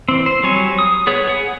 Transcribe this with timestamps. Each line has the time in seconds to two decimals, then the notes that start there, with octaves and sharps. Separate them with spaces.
0.09 E3 C4
0.26 C5
0.43 F#3 G3 C#5 G#5
0.79 D#6
1.07 B3 G#4 C#5
1.28 G#4 F#5